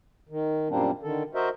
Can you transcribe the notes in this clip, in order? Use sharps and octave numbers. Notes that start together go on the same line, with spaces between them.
D#3
F#2 A#2 G3 A#3 C4 D4
D3 D#3 A4
F#4 A#4 C5 D#5 E5